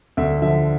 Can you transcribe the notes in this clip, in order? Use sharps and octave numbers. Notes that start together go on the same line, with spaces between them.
D2 E5
D3 F3 E5